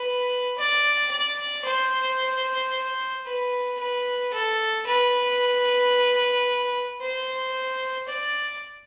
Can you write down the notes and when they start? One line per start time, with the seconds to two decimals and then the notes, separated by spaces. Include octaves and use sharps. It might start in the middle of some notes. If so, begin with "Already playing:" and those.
Already playing: B4
0.59 D5
1.12 D5
1.66 C5
3.27 B4
3.80 B4
4.34 A4
4.87 B4
7.02 C5
8.08 D5